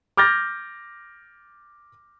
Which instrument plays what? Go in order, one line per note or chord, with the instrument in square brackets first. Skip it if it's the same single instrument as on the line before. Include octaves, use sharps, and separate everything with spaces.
[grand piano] D6 F6 G6 A6 A#6